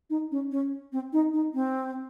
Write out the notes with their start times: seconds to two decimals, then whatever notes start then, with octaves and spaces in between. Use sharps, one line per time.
0.10 D#4
0.32 C#4
0.51 C#4
0.92 C4
1.13 D#4
1.33 D#4
1.54 C4